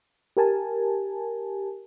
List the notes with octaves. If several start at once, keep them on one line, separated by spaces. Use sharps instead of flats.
G4 A#4 G#5 A5